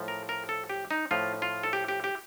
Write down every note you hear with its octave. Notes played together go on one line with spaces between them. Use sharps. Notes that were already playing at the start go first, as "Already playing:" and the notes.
Already playing: A2 F3
A#4
A#4
A4
G4
D#4
A2 F3 F4
F4
A4
G4
G4
G4